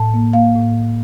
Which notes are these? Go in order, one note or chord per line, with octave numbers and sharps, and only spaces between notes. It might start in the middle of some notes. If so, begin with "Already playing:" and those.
Already playing: A2 A5
A#3
A#3 F5
A2